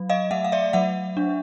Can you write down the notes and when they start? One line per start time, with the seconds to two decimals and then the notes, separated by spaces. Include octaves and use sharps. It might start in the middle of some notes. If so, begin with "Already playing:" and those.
Already playing: F#3
0.09 D#5 F5
0.31 A3 E5 F#5
0.44 F5
0.52 D5 E5
0.73 F#3 E5 F#5
1.17 D4